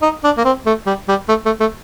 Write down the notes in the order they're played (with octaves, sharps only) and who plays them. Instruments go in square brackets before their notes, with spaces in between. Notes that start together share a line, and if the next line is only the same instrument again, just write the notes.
[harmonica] D#4
D4
A#3
C4
A3
G3
G3
A3
A3
A3